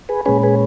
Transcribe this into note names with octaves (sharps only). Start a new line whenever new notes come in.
G#4 B4
A#2 G#3 C#4 G#4 B4
G#4 B4